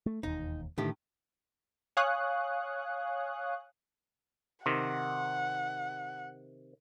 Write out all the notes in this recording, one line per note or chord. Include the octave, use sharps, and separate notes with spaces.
A3
E1 D#2 D#4
A2 D3 D#3 G4
C#5 F5 G#5 C#6 D#6 F#6
C3 D#3 F#5